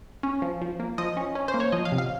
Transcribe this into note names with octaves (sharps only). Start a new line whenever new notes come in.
C#4
F3
F3
A#3
F3 D#5
C#4
C#4
C5
A#3
C#5
F3 D#5
F5
C3
F5